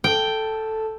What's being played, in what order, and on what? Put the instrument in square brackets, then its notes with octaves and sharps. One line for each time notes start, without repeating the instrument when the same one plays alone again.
[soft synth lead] A4 [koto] G5